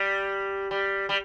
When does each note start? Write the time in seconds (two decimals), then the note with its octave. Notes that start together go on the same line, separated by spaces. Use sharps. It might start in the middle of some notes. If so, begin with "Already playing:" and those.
Already playing: G3
0.71 G3
1.09 G3